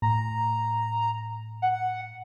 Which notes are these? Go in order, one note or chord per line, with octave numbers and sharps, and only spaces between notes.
A2 A#5
F#5